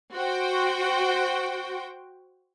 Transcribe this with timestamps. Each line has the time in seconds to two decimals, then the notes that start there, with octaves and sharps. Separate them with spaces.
0.14 F#4 C5 G5